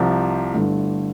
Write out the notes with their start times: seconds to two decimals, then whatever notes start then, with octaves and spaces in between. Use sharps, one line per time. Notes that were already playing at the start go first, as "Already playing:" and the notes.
Already playing: C2 C3 F3
0.53 G1 G2 D3 A3 E4